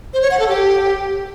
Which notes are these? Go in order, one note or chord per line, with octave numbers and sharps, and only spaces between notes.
C5
C#5
F#5
A4
G4